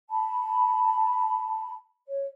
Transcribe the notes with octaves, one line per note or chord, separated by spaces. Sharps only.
A5 B5
C#5